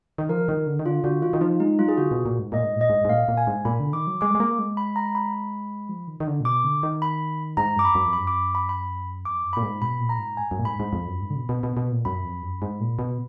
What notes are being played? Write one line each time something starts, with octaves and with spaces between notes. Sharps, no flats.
D#3
F3 A#4
D#3
D3
D#3
D3 F4
D3 F#4
D#3 F4
D#3
F3 D#4
G#3 D#4
F#3 F4
G#4
D3 F#4
B2
A#2
G#2
A#2 D#5
G#2
A#2 D#5
G#2
G#2
A#2 F5
A#2
G#5
G#2
A#2 B5
D3
D#3 D6
F#3
G#3 D6
G#3
A#3
G#3
B5
A#5
B5
F3
D#3
D#3
D3
A#2
B2 D6
D3
D#3
B5
G#2 A#5
F#2 D6
B5
F#2
F2
F#2 B5
D6
B5
B5
F2 D6
F#2
A#2 B5
G#2
B2 B5
A#2
A#5
G#2
G#5
F#2
A#2
G#2 B5
G#2
F2
F#2
G#2
D3
B2
B2
B2
B2
A#2
F#2 B5
F2
F#2
G#2
A#2
B2